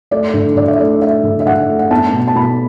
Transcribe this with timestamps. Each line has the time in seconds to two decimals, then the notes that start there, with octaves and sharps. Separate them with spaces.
0.11 A3 D5
0.34 D3
0.56 D3 D5
0.68 E5
0.79 A3 D5
1.01 A3 E5
1.23 D3
1.40 E5
1.46 D3 F#5
1.69 A3
1.79 F#5
1.91 B3 A5
2.13 B2
2.28 A5
2.35 B2 B5